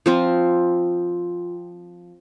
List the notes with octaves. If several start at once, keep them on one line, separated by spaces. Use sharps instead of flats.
F3 C4 F4